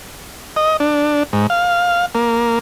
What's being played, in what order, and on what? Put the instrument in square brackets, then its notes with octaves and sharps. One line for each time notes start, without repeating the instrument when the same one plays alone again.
[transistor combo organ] D#5
D4
G#2
F5
A#3